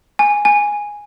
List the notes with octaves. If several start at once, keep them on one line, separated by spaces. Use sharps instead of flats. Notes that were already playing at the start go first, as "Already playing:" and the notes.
G#5
G#5